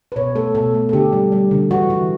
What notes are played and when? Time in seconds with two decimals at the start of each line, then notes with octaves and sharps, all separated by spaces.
0.12 B4
0.16 B2 C#5
0.35 A3 A4
0.55 B2 A4
0.74 A3
0.89 A4
0.93 D3 G4
1.13 G3
1.32 G3
1.51 D3
1.71 E3 F#4
1.90 E3